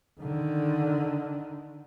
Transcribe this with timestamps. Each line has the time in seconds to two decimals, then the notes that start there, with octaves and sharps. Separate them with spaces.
0.20 D3 D#3